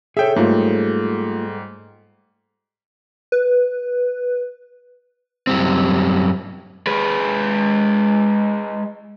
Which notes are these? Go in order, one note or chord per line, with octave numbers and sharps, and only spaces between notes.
G#4 A4 C#5 E5 G5
G#2 G3 A3 A#3 F4
B4
F#2 G3 C4
G#3 B4